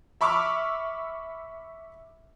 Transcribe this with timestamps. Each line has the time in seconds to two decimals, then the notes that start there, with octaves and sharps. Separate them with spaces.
0.21 E5 B5 C#6 D6 E6 F6